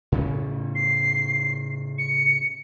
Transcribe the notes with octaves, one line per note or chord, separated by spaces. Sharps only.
A2 C#3 C#4
C7
C#7